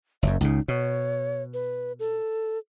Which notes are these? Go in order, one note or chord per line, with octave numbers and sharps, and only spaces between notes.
F#1 F#2 E5
C#2 C#3 D#4
B2 C#5
B4
A4